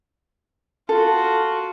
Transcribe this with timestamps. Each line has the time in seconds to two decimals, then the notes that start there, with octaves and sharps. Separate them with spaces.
0.89 F4 F#4 A4